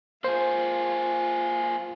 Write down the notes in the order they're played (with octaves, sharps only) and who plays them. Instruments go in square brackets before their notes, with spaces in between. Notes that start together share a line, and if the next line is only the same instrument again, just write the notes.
[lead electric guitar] A#3 G#4 [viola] F4 [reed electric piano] C5